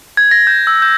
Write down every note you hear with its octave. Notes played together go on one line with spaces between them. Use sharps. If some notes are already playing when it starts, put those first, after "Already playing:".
G#6
A#6
G6
E6
G6